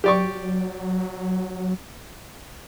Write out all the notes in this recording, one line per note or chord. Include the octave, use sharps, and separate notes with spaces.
F#3 G4 D5 C#6